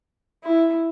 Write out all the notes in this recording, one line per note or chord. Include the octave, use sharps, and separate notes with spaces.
E4